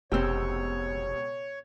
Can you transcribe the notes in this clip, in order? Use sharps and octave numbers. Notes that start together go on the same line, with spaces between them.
F1 C#2 B2 C4 G4 C#5 E6